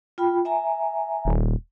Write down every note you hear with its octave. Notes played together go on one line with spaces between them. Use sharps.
F4 G5 B5
E5 G#5 A#5
D#1